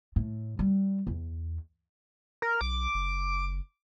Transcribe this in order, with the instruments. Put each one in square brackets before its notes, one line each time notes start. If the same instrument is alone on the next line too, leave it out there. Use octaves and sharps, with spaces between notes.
[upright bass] A2
G3
E2
[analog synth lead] A#4
[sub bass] B1 [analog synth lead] D6
[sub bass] F#1